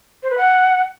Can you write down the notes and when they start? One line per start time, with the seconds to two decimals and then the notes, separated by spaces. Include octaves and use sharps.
0.23 C5
0.30 B4
0.38 F#5